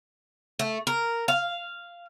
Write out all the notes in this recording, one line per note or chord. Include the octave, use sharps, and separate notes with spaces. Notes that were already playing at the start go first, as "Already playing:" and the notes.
A3
A#4
F5